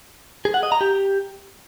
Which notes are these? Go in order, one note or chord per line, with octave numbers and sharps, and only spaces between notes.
G#4
F#5
D#5
A#5
G4